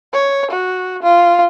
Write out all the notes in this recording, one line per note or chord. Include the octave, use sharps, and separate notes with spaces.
C#5
F#4
F4